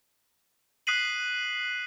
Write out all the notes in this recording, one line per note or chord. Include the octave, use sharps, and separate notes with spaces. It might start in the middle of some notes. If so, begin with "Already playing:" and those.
D#6 F#6 B6 C7 D#7 F#7